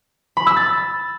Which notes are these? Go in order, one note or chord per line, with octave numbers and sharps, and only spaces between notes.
B5
E6
A6